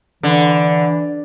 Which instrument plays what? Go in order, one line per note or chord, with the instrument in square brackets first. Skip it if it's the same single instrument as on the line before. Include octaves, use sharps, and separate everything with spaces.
[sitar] D3 [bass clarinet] E3